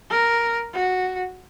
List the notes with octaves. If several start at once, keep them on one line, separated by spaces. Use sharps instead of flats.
A#4
F#4